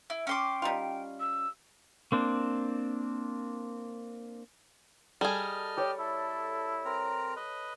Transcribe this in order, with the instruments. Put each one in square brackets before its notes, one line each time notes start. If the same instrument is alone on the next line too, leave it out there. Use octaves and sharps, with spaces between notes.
[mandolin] E4
[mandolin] C#4 C6 D6 [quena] G5
[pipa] G3 D#4 F4
[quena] E6
[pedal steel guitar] A#3 C4 D4
[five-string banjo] G3 G#4 [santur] A4 [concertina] D#5 F6
[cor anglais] G4 [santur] C#5 D5
[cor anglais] E4 [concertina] A4
[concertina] C4 A#4 A#5
B4 D#5